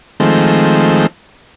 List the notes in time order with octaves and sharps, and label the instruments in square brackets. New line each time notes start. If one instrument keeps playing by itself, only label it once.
[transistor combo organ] D#3 F3 G#3 A3 C4